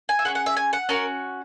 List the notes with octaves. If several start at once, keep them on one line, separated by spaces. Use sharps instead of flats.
G#5
E5
C#4 E4 G#4 F#5
F#5
E5
G#5
F#5
C#4 F#4 A#4